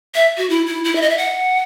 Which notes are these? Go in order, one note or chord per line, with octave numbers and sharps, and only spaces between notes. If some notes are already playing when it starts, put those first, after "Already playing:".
E5
F#4
E4
E4
E4
E5
D#5
E5
F#5